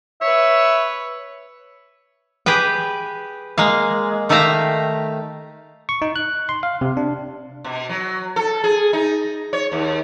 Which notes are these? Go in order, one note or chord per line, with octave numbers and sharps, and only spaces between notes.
B4 C#5 E5
G4 G#4 B4 G5
G#3 A#3 F5
D#3 A3 G4 E5 F5 A#5
C#6
D#4
F#6
C6
F5
C3
D4
B2
F#3
A4
G#4
D#4
C#5
D#2